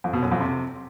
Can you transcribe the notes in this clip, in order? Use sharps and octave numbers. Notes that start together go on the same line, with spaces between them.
F2
B2
F#2
F2
C3